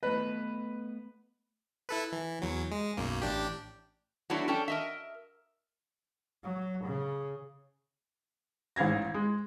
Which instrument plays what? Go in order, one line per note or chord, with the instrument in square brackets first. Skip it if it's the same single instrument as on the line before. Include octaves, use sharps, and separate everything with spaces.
[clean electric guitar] A3 B3 D#5 [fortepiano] B4
[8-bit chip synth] E4 A4 B4
E3
E2 F#3
G#3
B1 F#2 A#3
A1 D4 G4
[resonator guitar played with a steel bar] F#3 A3 B3 D4 E4 F#4
C#4 D4 A4 G5
A#4 D#5 E5
[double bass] F#3
C#3
[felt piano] A1 G#2 F5 G#6 A#6
G#3